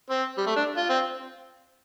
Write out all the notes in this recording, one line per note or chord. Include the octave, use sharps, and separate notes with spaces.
C4
G3
A3
D4
F4
C4